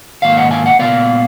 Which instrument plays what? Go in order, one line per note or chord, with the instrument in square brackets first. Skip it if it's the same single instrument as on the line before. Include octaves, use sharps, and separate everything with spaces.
[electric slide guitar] G#2 D#3 A#3 F5
D#5 F#5
F5 G#5
D#5 F#5
A#2 F3 B3 D5 F5